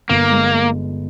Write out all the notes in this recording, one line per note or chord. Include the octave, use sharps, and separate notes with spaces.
G1 A#3
G#3